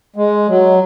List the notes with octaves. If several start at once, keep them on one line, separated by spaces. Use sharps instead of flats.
G#3
F#3